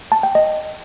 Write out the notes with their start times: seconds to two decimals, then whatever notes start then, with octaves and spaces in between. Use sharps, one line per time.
0.12 A5
0.23 G5
0.35 D#5